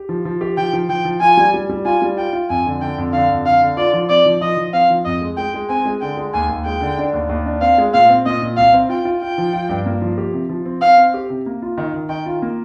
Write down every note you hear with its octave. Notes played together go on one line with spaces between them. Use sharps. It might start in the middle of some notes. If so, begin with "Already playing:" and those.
Already playing: G4
F3
F3
G4
F3 G5
F3
F3 G5
F3
F4 G#5
G3
G3
G3
F4 G#5
G3
F4 G5
F4
F2 G#5
D3
D3 G5
F2
D3 F5
F2
D3 F5
D3
F4 D5
F3
C4 D5
F3
F3 D#5
F3
C4 F5
F3
F2 D#5
G#3
G#3 G5
G#3
C4 G#5
G#3
D3 G5
G#3
D#2 G#5
D#2
G#3 G5
D3
D4
D#2
D#2
D4
C4 F5
G#3
A#2 F5
C4
A#2 D#5
A#2
C2 F5
C4
F4 G5
F4
F4 G5
F3
F4
G2
A#3
F3
G4
C3
F3
C4
C4 F5
C4
G4
C3
A#3
F4
D#3
D#3
D#3 G5
F4
A#3